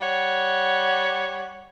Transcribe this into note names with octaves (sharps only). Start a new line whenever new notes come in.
G3 C#5 F#5